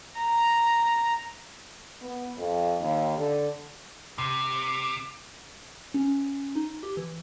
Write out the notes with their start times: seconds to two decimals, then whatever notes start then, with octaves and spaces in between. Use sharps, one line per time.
0.18 A#5
2.02 B3
2.38 F2
2.81 D#2
3.17 D3
4.18 C3
5.94 C#4
6.56 D#4
6.83 G4
6.97 E3